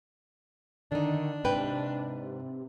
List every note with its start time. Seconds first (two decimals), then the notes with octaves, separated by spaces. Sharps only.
0.92 D3 D#3 D4 D#4
1.44 G#2 C3 B4 G5